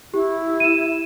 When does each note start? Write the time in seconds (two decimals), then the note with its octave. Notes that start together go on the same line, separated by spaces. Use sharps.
0.14 E4 G4
0.60 D#7 E7